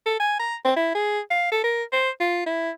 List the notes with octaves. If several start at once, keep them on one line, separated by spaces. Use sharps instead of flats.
A4
G#5
A#5
C4
E4
G#4
F5
A4
A#4
C5
F4
E4